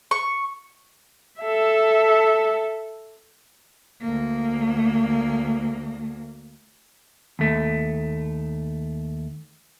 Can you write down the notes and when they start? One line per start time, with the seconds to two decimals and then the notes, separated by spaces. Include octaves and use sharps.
0.11 C#6
1.41 A4 E5
4.01 D2 A#3
7.39 D#2 A3